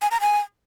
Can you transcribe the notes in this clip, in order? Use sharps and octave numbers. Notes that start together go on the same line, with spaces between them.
G#5
A#5
G#5